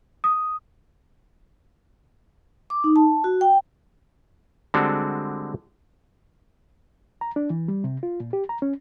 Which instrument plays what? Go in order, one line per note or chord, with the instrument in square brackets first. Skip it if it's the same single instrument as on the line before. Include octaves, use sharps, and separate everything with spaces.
[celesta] D#6
[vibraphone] D6
D#4
A5
F#4
G5
[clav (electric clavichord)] D3 G3 G#3 C4 D4 F#4
[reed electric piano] A#5
D4
E3
G3
C3
F4
A#2
G4
A#5
C#4